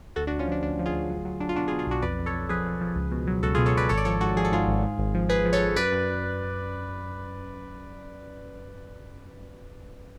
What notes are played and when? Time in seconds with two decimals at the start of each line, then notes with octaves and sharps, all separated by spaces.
0.16 D2 F#4 A4
0.27 D4 F#4
0.31 D2
0.39 C#4 F4
0.47 F3 D4
0.63 D2 D4
0.79 F3
0.86 F4 G#4
0.94 D2
1.10 F#3
1.25 F#3
1.40 F#3 D4
1.49 F4
1.56 B2 D4 F#4
1.68 F4 G#4
1.72 B2
1.79 F4 G#4
1.87 B1 D4 F#4
2.02 F2 B4 D5
2.18 F2
2.26 A4 C#5
2.34 F2
2.49 F3 G#4 B4
2.66 F3
2.81 F3
2.96 C#2
3.12 B2
3.27 F#3
3.42 C#2 F#4 A4
3.55 F4 G#4
3.58 B2
3.66 A4 C#5
3.74 B2 B4 D5
3.89 G#1 A4 C#5
3.97 D5
4.05 F3 A4 C#5
4.21 G#2 F#4 A4
4.36 F3 G#4
4.45 A4
4.52 G#2 F4 G#4
4.68 G#1
4.83 G#2
4.98 G#1
5.14 F3
5.29 F3 G#4 B4
5.45 F3
5.53 A4 C#5
5.60 F3
5.76 F#2 B4 D5
5.92 F#2